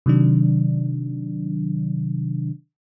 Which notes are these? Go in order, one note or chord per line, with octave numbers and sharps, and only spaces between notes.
C3 D#3 F#3 D4